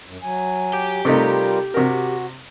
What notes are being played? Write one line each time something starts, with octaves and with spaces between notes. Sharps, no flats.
F#2
F#3 G#5
G4
C3 G3 A3 D#4 F4 A#4
C3 F#4 A#4